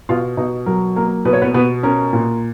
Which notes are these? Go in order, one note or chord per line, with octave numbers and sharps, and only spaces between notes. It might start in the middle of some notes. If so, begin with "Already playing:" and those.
B2 F4 F5
B2 D#4 D#5
F#3 A#4
A#3 A#4
B2 B4
C#5
B3 B4
B2 B3 B4
C#4 A#4
A#2